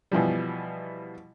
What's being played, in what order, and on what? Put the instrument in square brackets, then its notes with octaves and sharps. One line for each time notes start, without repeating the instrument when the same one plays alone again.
[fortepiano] B2 E3 F3 G3